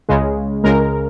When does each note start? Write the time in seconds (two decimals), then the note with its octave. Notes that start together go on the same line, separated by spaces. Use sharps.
0.09 C#2 C#3 G#3
0.64 C#2 C#3 G#3 A#4